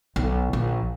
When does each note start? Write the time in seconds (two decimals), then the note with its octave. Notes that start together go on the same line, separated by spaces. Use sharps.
0.16 B1
0.53 A#1